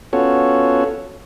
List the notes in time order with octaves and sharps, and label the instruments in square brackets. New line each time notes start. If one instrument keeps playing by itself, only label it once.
[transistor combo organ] B3 C#4 F4 F#4 A4 C#5